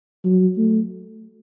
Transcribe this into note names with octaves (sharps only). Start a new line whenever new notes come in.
F#3
A3